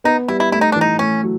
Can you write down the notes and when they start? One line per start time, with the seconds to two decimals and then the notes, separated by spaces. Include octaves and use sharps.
0.04 B3 D#4
0.28 G3 E4
0.40 E4
0.52 A3 E4
0.61 D#4
0.72 E3 D4
0.81 D#4
0.99 A3 C#4
1.23 F#3